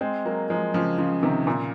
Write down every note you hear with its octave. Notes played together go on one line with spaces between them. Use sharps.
G#3 C4
F#3 A#3
F3 G#3
C#3 F3
C#3 F3
C3 D#3
A#2 C#3